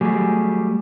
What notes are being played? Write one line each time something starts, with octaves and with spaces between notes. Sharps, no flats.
F#3 G3 A3 G4 G#4